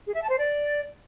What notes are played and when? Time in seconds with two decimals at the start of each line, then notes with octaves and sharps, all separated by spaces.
0.06 G#4
0.14 E5
0.23 A5
0.31 C5
0.39 D5